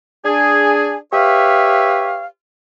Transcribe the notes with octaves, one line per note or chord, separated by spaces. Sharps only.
D4 G#4
G4 B4 C#5 E5 F5